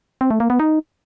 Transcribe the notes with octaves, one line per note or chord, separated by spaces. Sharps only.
C4
A3
A#3
B3
D#4